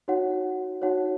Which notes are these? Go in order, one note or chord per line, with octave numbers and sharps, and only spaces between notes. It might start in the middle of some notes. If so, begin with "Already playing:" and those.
D#4 F#4 C#5 F#5
D#4 F#4 C#5 F#5